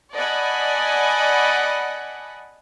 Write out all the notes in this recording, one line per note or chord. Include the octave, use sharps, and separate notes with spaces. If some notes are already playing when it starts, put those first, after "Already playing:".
D5 D#5 F#5 G#5 A5 B5